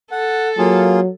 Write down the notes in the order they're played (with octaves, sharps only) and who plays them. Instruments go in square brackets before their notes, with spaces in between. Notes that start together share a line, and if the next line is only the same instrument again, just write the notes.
[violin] A4 [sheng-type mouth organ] F#5
[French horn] F#3 [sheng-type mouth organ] A#3 F4 G#4